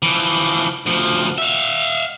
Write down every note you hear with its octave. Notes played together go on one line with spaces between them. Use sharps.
E3 F3
D2 F3
E5 F5